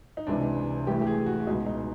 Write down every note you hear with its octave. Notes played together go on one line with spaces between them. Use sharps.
D#4
C#2 C3 E3 D4
A1 A2 E3 G4
G4
G#4
F#4
C#2 B2 D#4
D#4